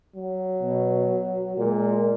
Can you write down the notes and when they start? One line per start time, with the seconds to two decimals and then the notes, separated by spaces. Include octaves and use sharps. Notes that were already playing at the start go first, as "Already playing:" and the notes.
0.15 F#3
0.62 B2
1.57 A#2 G#3